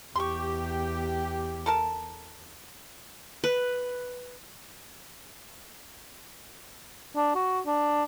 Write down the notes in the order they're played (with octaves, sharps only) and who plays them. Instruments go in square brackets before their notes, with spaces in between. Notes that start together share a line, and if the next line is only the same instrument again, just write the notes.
[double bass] E2 [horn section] G4 [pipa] C6 C#6
[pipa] A4 A#4 A5
[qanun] B4
[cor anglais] D4
F#4
D4